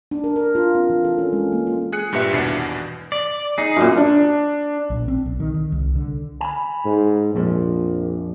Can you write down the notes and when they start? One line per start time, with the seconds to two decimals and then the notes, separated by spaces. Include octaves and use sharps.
0.11 D4
0.24 A#4
0.36 A#4
0.55 F4
0.75 C4
0.90 E3
1.05 A4
1.18 C#4
1.33 G#3
1.52 A#3
1.67 F4
1.92 G#4 F#6 C#7
2.12 G2 A#2 G4 B4 E5 C#7
2.32 G#1 E2 B2 D4 C7
3.12 D5
3.58 D#4 G#4
3.76 F#2 A#2
3.98 D4
4.90 A#1
5.08 C4
5.26 B1
5.40 D#3
5.54 D#3
5.72 C2
5.95 D3
6.41 G#5 B5
6.85 G#2
7.35 A#1 F2 A#2 F3